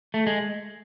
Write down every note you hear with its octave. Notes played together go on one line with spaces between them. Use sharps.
A3
G#3